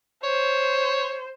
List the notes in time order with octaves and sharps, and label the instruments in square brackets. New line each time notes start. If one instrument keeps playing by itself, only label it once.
[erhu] C5 [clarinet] C#5